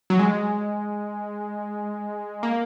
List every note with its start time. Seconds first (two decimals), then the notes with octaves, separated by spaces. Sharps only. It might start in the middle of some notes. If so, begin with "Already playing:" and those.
0.10 F#3
0.19 G#3
2.43 A#3